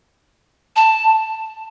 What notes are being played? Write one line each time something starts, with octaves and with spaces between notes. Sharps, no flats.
A5